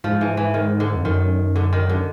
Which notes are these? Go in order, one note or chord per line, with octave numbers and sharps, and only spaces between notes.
G#2 F3
E3
E3
D#3
D3
F2
F#2 D#3
D3
D#3
D3